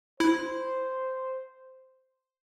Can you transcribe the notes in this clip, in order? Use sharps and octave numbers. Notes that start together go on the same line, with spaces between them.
E4 C5